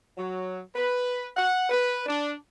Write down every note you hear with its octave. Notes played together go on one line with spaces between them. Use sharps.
F#3
B4
F#5
B4
D4